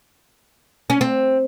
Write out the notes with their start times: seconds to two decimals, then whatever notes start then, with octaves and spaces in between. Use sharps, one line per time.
0.90 C#4
1.01 C4